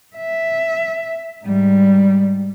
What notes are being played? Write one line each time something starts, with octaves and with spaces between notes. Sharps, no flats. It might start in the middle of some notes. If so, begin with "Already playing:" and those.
E5
G#2 G3